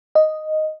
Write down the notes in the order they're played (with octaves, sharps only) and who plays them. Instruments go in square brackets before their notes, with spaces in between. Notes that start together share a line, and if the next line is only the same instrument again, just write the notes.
[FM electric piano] D#5